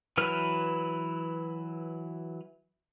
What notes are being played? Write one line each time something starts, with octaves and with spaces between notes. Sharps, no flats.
E3 F#3 E4 B4 F6